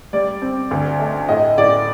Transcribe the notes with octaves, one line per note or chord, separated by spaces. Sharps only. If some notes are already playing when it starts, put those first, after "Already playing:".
G3 D5
C4
D2
A3
A2 D#5
A2 D5